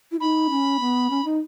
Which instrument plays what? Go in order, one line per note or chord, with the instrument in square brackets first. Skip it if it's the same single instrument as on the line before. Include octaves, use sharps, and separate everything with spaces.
[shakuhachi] E4
[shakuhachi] D#4 [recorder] B5
[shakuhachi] C#4
B3
C#4
D#4